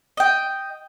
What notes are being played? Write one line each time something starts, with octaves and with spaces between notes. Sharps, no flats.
D#5 G5